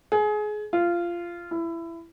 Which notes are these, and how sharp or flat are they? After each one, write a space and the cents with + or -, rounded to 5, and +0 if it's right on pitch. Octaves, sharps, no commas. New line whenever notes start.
G#4 +25
F4 -15
E4 +20